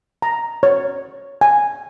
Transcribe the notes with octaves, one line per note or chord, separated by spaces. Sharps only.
A#5
C#5
G#5